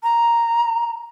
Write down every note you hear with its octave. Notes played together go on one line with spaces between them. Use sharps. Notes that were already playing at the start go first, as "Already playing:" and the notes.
A#5